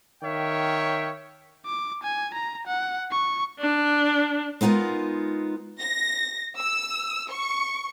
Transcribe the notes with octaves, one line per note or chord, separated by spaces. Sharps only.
D#3 C#5 E5 F5 G5
D6
G#5
A#5
F#5
C#6
D4
G#3 B3 D#4 F4 A#4
A#6
E6
C#6